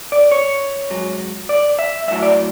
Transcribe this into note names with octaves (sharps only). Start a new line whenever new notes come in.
D5
C#5
G#2 F#3
D5
E5
B1 A2 F#3 E5
D5